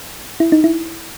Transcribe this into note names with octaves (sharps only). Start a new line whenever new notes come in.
E4
D#4
E4